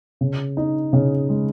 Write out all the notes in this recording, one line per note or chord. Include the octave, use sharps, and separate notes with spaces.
C#3
D#4
C#3
G#3